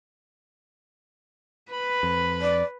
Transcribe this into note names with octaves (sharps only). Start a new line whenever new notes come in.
B4 B5
F2
D5